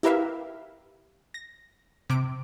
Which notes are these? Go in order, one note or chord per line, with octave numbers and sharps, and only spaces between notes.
E4 G4 A#4 B4 E5 F5
A#6
C3 D6 D7